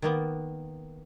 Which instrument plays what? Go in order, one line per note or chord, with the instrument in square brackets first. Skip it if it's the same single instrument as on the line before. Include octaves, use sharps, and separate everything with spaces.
[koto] D#3 A#3 B3